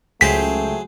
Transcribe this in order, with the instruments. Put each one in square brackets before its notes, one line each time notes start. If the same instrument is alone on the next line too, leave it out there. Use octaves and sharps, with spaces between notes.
[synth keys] C#2 G5 [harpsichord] F#3 G#4 C5 [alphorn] A3 [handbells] B6